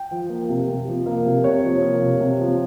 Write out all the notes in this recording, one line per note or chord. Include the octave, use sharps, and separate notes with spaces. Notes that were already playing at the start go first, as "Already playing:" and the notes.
Already playing: G5
F3
A#3
C3
C3
F3
A#3
C3
C3 C#5
F3
A#3
C3
C3
F3